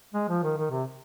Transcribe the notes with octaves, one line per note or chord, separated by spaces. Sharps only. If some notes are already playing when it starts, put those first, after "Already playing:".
G#3
F3
D#3
D#3
C3